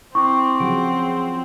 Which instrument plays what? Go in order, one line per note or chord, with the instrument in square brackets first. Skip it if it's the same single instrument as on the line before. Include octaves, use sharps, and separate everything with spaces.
[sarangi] C4 [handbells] E4 D6 [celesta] C#6
[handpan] C#3 F3 F#3 [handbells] G#4 F#5 D7